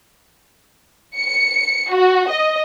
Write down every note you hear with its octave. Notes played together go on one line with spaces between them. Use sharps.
C#7
F#4
D#5